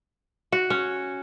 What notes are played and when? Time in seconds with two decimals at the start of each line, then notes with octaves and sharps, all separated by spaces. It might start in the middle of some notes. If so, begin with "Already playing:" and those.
0.52 F#4
0.70 C#4